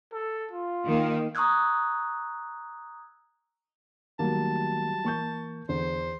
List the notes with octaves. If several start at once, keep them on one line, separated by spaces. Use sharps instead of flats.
A4
F4
D#3 A#3
A#5 C#6 D#6 E6 F#6 G#6
D#3 F#3 G3 A3 A#3 A5
E3 A#3 C#6 G6
E2 D3 C5